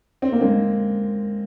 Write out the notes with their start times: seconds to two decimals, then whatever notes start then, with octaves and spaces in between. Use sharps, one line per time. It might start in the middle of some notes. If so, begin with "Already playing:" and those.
0.22 C4
0.32 A#3
0.41 G#3 C4